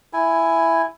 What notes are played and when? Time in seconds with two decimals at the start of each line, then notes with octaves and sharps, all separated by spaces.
0.13 E4 G#5